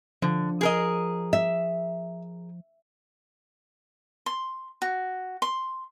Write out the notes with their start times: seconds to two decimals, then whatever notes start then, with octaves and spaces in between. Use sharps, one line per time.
0.22 D3 F3
0.61 G#4 A#4 D#5
1.33 E5
4.26 C6
4.82 F#4
5.42 C6